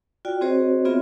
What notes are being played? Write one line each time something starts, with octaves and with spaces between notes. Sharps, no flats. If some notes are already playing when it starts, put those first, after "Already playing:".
F4 F#4 D5 G5
C4 F#4 G#4 C5 C#5 D#5
B3 C4 F4 G#4 C#5 E5